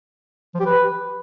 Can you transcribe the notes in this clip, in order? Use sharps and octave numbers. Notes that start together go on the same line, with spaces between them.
F3
G4
B4